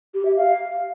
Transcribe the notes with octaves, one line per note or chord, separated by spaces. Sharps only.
G4
E5
F5